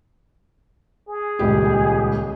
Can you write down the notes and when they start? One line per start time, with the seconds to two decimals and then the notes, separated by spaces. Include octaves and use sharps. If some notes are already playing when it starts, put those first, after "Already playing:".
1.08 G#4
1.39 D#1 C#2 G4